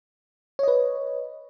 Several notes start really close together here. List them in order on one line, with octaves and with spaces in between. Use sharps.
C#5 D#5 B4